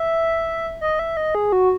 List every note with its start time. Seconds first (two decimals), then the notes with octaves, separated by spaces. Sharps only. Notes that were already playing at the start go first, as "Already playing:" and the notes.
Already playing: E5
0.81 D#5
0.99 E5
1.17 D#5
1.35 G#4
1.52 F#4